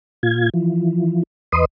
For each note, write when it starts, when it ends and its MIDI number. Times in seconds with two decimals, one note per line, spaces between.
0.23 0.49 46
0.23 0.49 65
0.23 0.49 92
0.54 1.23 52
0.54 1.23 53
1.52 1.65 40
1.52 1.65 71
1.52 1.65 75
1.52 1.65 84
1.52 1.65 87